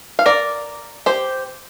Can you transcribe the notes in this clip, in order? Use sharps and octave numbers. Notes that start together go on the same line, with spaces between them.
F5
A#4 D5
G4 C5